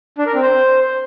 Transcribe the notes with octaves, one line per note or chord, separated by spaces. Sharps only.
D4
A#4
C4
C5